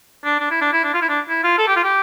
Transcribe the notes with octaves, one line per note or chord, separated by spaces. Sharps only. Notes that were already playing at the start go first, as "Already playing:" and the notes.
D4
D4
E4
D4
E4
D4
F4
E4
D4
E4
F4
A4
G4
F4
G4